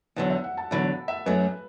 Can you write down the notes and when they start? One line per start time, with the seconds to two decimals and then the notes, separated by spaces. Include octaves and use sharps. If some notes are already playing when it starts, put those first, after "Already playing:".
0.16 E2 D3 F#3 F#5
0.30 E5
0.44 F#5
0.57 A5
0.71 E2 D3 F#3 B5
1.08 E5
1.26 F#2 F#3 A3 B4